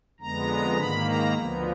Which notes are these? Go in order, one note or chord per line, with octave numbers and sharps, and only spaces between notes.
F2 D3 G#3 B3 A#5
G#2 D#3 A#3 B5
A#5
D2 D3 F3 B3